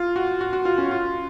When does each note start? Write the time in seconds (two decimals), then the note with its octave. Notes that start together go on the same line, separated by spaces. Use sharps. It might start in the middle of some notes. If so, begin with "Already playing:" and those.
Already playing: F4
0.16 F#4
0.41 F#4
0.53 F#4
0.65 F4
0.78 C#4
0.91 F4